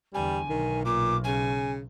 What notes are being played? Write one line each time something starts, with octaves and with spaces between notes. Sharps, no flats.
E2 D3 G3 G#5
B1 D#3
A#2 D6
C#3 G#5